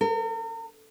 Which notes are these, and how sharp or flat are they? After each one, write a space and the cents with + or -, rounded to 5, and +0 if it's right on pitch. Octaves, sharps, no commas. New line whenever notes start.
A#4 -40